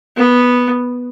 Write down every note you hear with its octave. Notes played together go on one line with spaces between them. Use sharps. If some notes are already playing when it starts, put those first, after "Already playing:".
B3